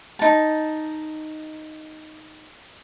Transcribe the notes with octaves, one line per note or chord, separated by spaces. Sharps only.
D#4 A5